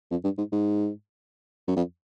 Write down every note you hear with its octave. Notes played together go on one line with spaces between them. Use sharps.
F2
G2
G#2
G#2
F#2
F2